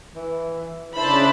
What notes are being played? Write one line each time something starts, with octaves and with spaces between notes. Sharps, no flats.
E3
C#3 D4 E4 C5 A5 B5